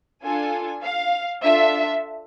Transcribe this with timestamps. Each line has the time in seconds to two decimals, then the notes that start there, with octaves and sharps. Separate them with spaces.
0.23 D4 F4 A4 G#5
0.83 F5
1.44 D4 F4 A4 E5